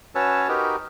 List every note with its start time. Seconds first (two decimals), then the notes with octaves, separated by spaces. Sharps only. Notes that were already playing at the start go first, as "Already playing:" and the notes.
0.15 C#4 F#4 B4 C#5 A5 E6
0.49 D#4 F#4 G4 A#4 B4